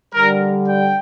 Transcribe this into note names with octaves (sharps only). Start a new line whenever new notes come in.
D3 G3 A#4
G5